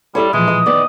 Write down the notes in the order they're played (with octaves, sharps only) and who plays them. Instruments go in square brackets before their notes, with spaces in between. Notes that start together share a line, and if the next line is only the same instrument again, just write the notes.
[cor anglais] G3 [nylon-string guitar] E4 A4 C#5 [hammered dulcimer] C6
[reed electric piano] A#2 F3 [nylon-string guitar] E3 [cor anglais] G#3
[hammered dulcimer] D#5
[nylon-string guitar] D#3 B3 [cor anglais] D5